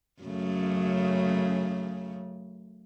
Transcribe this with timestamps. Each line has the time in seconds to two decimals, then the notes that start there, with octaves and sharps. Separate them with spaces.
0.23 F#2 C#3 A3